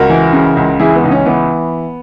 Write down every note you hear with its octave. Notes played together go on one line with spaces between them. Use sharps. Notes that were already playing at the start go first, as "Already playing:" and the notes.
Already playing: C#2 F#4 A#4
E3
C#3
C#2
E3 E4 G#4
B3
C#2 D#4
C#4
E3 B3